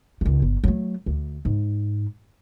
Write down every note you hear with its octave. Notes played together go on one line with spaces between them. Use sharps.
C#2 D#3
G1
F#3 A3
D2
G#2